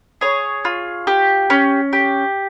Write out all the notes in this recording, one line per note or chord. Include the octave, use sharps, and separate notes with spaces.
G#4 C#5
F4
G4
C#4
G4